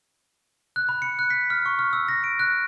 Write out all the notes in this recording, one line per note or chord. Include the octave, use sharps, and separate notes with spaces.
F#6
B5
C#7
F#6
B6
F6
C#6
F6
E6
A#6
D7
F#6